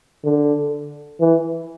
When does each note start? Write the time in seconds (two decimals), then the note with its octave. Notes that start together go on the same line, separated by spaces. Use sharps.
0.25 D3
1.20 E3